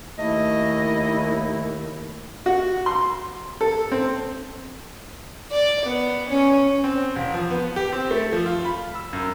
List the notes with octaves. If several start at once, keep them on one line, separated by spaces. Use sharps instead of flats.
D#2 A3 E4 D#5
F#4
C6
A4
C4
D5
B3
C#4
C4
E1
F3
B3
G4
C4
A3
F3
F4
B5
E6
F#2